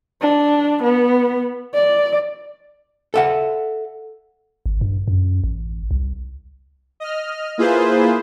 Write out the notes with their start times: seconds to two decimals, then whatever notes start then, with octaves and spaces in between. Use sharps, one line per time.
0.22 D4
0.83 B3
1.74 D5
3.14 A4 E5 F#5
4.66 G#1
4.81 G2
5.08 F#2
5.44 A1
5.91 C2
7.00 D#5 F6
7.58 A#3 E4 F4 G#4 B4 C5